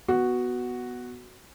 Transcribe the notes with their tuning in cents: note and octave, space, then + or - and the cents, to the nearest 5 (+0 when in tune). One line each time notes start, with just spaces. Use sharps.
B3 +0 F#4 +0